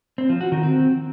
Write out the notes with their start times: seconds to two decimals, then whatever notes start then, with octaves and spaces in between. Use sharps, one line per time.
0.18 C4
0.29 F3
0.41 F#4
0.52 D#3
0.63 C4